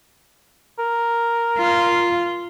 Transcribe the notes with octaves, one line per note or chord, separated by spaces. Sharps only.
A#4
F4